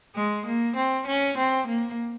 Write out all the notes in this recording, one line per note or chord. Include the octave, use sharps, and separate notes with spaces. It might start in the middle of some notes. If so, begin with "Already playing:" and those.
G#3
A#3
C4
C#4
C4
A#3